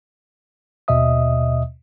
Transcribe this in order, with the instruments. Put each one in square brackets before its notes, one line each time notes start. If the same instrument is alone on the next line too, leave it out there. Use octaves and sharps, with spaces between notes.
[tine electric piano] D#2 B2 D#5 E5 D#6